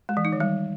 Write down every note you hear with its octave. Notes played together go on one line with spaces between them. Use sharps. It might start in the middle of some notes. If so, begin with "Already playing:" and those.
G#3
E3
D#4
D#3
G3